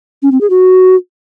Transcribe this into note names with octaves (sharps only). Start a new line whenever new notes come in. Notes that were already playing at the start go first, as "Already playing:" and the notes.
C#4
C4
G#4
F#4